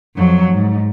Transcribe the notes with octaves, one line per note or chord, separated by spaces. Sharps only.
F2 F#3
G#2